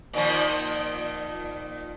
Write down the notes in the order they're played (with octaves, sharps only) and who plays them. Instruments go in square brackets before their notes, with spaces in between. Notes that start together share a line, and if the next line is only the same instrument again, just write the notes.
[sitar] A#2 D#3 F3